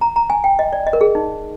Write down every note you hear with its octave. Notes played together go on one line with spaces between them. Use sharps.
A#5
A#5
G#5
G5
D#5
D5
D#5
A#4
G#4
D#4